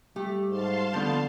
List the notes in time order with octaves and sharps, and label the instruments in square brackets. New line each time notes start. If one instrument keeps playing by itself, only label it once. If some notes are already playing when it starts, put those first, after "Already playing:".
[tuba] G3 [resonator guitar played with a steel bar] A3 G4
[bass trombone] G#2 [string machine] F5 A5 C6
[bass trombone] D3 [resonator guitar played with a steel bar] F3 A3 B3